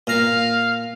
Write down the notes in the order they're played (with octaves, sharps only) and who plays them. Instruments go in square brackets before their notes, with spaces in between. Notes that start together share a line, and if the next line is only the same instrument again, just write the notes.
[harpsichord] A#2 A#5 [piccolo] F5